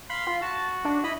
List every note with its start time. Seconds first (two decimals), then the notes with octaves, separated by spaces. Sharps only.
0.10 F5 B5 C6
0.27 F4
0.42 F#4 A5
0.85 D4
1.04 E4 D#5 B5